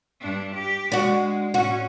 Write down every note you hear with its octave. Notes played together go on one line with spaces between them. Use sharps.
G2 D4
G4
G#3 D4 F#4
A2 C#4 F#4